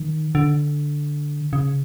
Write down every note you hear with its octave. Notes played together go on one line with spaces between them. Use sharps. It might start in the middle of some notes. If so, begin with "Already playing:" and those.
Already playing: D#3
D3
C#3